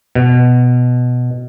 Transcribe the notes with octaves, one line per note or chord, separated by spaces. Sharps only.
B2